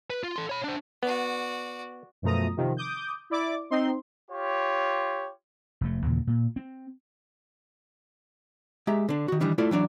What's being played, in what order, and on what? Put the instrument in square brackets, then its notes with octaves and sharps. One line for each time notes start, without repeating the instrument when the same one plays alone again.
[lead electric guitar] B4
F4
A4 C6
C#5 B5
D4 C5
[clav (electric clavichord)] B3 [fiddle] F#4 D5
[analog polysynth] F#2 B2 F3 A3 A#5 D#6
C3 D#3 F3
D6 D#6 G6
E4 D5 D6
C4 D#4 C6
[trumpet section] F4 G4 C#5
[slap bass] F1 F2 A3
D#2 A#2 C#3 E3
A#2
C4
[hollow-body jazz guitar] G#3 G4 E5 A#5
D3 D4
D#3 F#4
D#3 E3 G3 D4
A3 E4 F4 A4 D5
E3 F#3 D4 D5